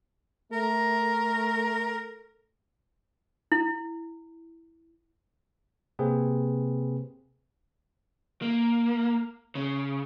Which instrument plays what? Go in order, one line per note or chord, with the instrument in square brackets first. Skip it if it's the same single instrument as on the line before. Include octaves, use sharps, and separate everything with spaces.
[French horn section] A3 [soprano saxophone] A#4
[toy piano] E4
[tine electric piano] C3 A#3 C4 G#4 B4
[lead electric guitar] A#3
C#3